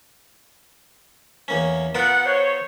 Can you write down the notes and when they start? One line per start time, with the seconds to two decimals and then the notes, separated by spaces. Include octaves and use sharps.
1.48 E2 A#3 C#4
1.95 B3 F4 A#4 F#5
2.25 C5 C#5